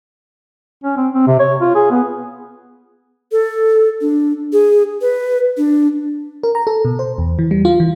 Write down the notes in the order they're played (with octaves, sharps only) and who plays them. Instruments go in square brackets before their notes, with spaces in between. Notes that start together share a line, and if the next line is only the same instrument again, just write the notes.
[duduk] C#4
C4
C4
C3
C#5
F4
G#4
B3
[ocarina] A4
D4
G#4
B4
D4
[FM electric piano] A#4
A#5
A4
B2
C5
E2
E3
G3
F4
E3